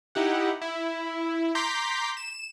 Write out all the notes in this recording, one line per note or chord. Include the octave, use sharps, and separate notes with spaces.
D#4 E4 G4 F#5
E4
A#5 C6 D6 G6 B6
E7